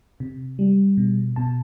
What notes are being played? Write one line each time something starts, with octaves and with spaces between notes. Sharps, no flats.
C3
G3
B2
B2 A5